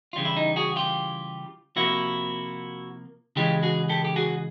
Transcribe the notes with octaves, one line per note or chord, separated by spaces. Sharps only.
C#3 E3 G3 F4
E4
D#4
F#4 G#4
F4 G4
C3 F3 A#3 E4 F#4
C#3 E3 G#3 F4 G4
F#4 G#4
G4 A4
G4
F#4 G#4